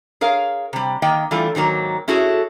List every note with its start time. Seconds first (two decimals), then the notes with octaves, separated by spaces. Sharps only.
0.21 G#4 A#4 C#5 F5
0.73 C3 G3
1.02 D#3 A#3 D#5 G5
1.31 E3 G3 A3 F4
1.55 G#2 D#3 F#3 A#3
2.08 C#4 E4 F#4 G#4 A4